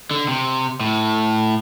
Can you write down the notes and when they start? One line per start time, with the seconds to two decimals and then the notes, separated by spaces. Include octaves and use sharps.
0.11 D3
0.28 C3
0.80 A2